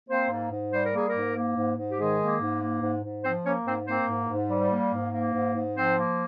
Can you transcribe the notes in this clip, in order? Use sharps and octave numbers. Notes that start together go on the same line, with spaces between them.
A#3 C4 C5
G#2
G#2
G3 C5
A#4
A#3 G#4
A#3 A#4
G#2
A#3
G#2
G#2
G4
D#3 G#3 G#4
A#3
G#2
A#3
G#2
G#2
F3 C4 C5
A#3 C#4 C#5
G#2 C4 C5
A#3 C4 C5
G#2
G#2
G3
A#3
G#2
A#3
G#2
G#2
F3 C4 C5
A#3